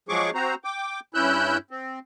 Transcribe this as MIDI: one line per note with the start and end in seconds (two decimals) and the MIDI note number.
0.09 0.30 53
0.09 0.30 54
0.09 0.30 56
0.09 0.30 68
0.09 0.30 85
0.09 0.30 86
0.34 0.55 60
0.34 0.55 66
0.34 0.55 72
0.34 0.55 82
0.64 1.00 79
0.64 1.00 86
1.14 1.58 43
1.14 1.58 61
1.14 1.58 64
1.14 1.58 88
1.14 1.58 90
1.14 1.58 91
1.71 1.99 60